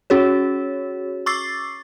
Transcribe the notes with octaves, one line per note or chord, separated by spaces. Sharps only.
C#4 F#4 G#4 C#5
C#6 D6 E6 A6 C7